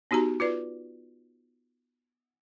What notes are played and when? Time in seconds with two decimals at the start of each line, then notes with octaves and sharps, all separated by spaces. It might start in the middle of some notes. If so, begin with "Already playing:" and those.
0.11 B3 D#4 F#4 G4 A#5
0.40 F4 B4 D5